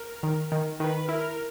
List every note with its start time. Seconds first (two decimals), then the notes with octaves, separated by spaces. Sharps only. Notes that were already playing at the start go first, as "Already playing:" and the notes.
Already playing: A#4
0.23 D#3
0.52 D#3
0.80 D#3 B4
1.09 E4 A#4